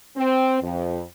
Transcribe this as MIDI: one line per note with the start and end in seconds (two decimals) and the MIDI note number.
0.16 0.57 60
0.62 1.01 41